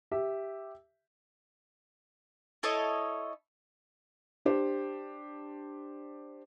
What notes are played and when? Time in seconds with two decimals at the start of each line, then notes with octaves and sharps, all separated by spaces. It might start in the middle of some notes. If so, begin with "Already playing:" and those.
0.11 G4 E5
2.63 E4 A4 C#5 D#5
4.45 D4 G4 C5